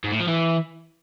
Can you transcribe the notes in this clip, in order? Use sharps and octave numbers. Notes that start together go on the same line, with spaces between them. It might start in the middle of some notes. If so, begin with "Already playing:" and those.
G#2
A2
F3
E3